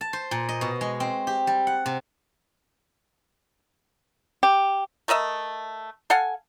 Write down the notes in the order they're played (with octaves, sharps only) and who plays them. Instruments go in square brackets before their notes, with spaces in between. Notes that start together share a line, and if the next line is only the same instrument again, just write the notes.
[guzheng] A5
C5
A#2
D#5
B2
G#3
C4
G4
G3
F#5
C3
[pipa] G4
A3 A#4 D#5 E5
A4 F5 F#5 G#5